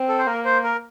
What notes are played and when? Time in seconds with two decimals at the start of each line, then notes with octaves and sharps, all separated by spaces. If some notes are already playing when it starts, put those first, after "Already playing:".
Already playing: C4
0.08 A4
0.18 C5
0.27 A#3 A#4
0.45 C5
0.63 A#4